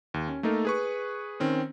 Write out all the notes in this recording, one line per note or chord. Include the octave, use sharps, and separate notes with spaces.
D#2
C#4
A3 A#3 D#4 A4 A#4
G#4 B4 C#6
D#3 C4 C#4